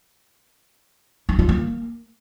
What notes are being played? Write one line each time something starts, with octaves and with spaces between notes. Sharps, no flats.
E4
F4
A#3